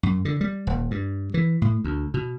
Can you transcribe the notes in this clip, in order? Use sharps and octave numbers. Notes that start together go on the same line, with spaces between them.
F#2
D3
G3
D#1
G2
E3
A2
D2
B2